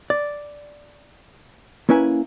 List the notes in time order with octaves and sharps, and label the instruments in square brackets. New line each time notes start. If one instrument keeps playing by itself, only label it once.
[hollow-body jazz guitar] D5
A#3 C#4 E4 B4 G#5